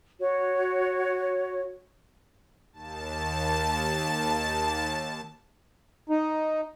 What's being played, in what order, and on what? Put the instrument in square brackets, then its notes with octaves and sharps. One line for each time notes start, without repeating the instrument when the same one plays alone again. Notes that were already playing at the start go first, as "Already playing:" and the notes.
[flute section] F#4 C#5
[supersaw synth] D#2 A5
[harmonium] D#4